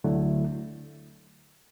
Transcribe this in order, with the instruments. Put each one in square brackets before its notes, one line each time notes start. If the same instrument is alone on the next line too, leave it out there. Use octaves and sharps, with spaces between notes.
[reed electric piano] D2 D3 F#3 A3 E4